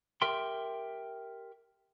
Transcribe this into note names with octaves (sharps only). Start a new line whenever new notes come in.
G4 A#4 E5 G5 C6